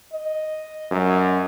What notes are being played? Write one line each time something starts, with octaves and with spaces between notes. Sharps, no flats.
D#5
F#2